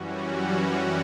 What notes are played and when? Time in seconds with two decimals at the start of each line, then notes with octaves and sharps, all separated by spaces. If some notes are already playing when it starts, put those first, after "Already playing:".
Already playing: F#2 E3 G3 C#4 F#4